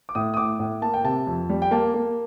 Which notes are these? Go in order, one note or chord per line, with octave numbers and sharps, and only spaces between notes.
D6
A2 D#6
D#6
A2 D6
A2
A#3 A5
G5
C3 A5
F2
G3
G5
A#3 A5
A#3